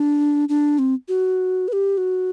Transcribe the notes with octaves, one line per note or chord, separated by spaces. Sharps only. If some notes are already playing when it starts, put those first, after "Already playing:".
Already playing: D4
D4
C4
F#4
B4
G4
F#4